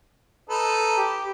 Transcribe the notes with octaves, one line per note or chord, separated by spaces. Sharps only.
D#4 A4 B4
G4